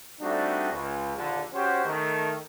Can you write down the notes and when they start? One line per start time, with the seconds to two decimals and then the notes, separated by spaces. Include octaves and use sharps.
0.21 G3 A3 C4 D4 D#4 F#4
0.72 C#2
1.16 A#1 D#2 D3
1.53 C#4 F#4 G4 C5
1.85 D#3 A3